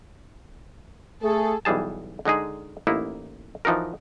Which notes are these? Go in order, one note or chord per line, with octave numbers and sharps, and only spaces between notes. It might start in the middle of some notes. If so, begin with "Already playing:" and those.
A3 G#4 A4
B1 E3 G3 G#4 A5
D3 G#3 D#4 G#4
A1 A#3 D#4 E4
E3 F3 D#4 F#4 A#4